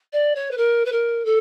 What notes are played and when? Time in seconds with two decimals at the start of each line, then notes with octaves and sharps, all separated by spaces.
0.12 D5
0.35 C#5
0.51 B4
0.57 A#4
0.85 B4
0.92 A#4
1.25 A4